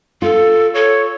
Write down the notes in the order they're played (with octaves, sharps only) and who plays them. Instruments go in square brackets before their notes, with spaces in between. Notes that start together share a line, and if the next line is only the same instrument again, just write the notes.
[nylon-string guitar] F4 [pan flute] A4
[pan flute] A4 [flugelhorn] C#5